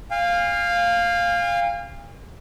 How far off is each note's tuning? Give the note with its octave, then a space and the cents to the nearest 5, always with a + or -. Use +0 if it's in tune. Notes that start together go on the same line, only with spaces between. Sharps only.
F5 +0 G#5 -45